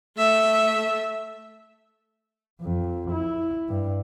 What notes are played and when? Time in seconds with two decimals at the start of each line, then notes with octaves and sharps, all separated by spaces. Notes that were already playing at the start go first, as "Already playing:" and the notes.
0.17 A3 E5
2.61 F2
3.12 E4
3.69 G2